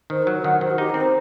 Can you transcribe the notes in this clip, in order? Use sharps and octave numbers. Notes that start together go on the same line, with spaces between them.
D#3 C5
A#4
F#3
A#4
D#3 F#5
D#3 C5
F#4
D#4 G4
C4 A#4
C5